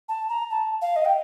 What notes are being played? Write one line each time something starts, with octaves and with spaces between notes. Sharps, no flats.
A5
A#5
A5
F5
D#5
G5